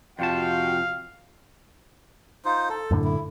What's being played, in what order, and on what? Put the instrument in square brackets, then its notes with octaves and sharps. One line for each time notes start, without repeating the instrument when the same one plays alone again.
[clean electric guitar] F2 C3 A5 [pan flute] F4 [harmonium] F#4 G5 [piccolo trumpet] F5
[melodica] D#4 F4 C5
A4
[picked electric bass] F#2 A2 D3
[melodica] E4